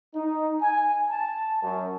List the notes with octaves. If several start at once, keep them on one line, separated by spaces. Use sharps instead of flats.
D#4
G#5
A5
F#2